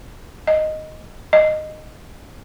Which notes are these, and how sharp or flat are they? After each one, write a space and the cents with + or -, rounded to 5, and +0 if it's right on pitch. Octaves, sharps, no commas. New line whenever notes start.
D#5 +0
D#5 -10